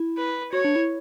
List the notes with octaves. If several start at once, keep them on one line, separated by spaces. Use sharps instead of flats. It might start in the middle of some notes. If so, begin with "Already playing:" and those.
Already playing: E4
B4
F#4 C#5
D4
E4